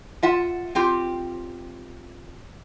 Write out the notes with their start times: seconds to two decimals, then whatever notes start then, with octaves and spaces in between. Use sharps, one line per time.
0.23 F4 E5 F#5
0.75 C4 F4 G4